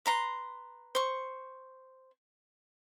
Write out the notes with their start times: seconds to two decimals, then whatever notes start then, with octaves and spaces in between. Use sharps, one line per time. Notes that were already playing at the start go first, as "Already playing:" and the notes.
0.06 B4 A#5 C6
0.95 C5 C#6